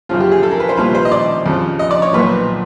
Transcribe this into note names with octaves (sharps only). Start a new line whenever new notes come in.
F#2 C#3 F3 F4
G4
G#4
A4
A#4
B4
C5
C2 A#2 F3 B4
C5
D#5
D5
F2 C#3 F3
D#5
D5
C#5
B1 A#2 F3 B4